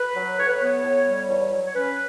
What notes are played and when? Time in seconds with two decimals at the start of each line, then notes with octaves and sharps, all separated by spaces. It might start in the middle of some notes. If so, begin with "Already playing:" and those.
Already playing: B4
0.16 F#3
0.39 A2 C#5
0.48 B4
0.57 B3 C#5
0.84 A2
1.06 G3
1.29 E2 C#5
1.52 F#3
1.65 C#5
1.74 C#4 B4